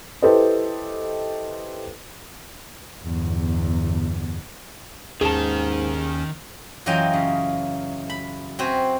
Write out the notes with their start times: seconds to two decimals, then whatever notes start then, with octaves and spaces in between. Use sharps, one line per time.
0.22 E4 G4 A4 B4 C5 D#5
3.05 G1 E2
5.21 D#2 G#2 D#3 C#4 G#4 A5
6.86 F#2 E3 F#3 F4 D#5 G5
7.13 C#3
8.10 B5
8.59 C4 F#4 B4 C5 E5 G#5